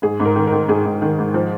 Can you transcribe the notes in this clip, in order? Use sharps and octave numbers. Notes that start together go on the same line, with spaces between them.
G#2 G#4
G#2
A#4
D#3
A#4
D#3
G#2 G#4
G#2
D#3
G#2
F3